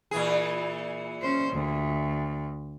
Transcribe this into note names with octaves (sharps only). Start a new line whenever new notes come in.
A#2 E3 G#4
C#4 C5
D2